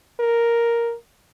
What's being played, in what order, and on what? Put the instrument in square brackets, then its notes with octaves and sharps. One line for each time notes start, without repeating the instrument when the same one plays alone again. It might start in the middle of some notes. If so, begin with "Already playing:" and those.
[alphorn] A#4